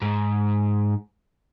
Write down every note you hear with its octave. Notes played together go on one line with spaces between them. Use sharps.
G#2